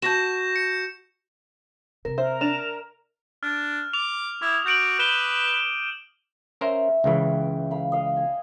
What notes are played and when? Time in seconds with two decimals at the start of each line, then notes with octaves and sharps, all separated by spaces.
0.02 F#4 A5 G6 A#6 E7
0.56 C#7
2.05 C3 C4 A#4
2.18 A#4 C5 E5
2.41 D4 F6 E7 F7
3.43 D4 F6
3.93 D6 F7
4.42 E4 D6 D#6
4.66 F#4 G6 D7 F#7
4.99 B4 D#7 E7 G7
6.61 C#4 A#4 C5 E5
7.04 C#2 C#3 E3 B4 G5
7.71 F5 B5
7.92 D#5 F5
8.16 G#5